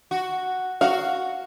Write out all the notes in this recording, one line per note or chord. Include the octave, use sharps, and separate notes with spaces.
F#4
F#4 F5